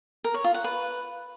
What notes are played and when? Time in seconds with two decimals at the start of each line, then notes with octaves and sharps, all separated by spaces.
0.24 A#4
0.34 C#5
0.44 F4
0.54 F#5
0.64 B4